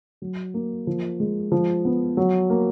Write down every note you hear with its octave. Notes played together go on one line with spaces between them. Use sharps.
F#3
A#3
F3
G#3
F3
B3
F#3
A#3